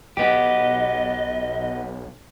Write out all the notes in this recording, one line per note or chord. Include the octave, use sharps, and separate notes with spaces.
B1 B3 G4 D#5